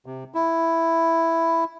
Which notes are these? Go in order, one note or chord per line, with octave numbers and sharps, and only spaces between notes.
C3
E4